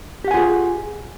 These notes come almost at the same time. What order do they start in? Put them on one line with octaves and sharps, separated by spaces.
G4 F#5 G#5 F4 G#4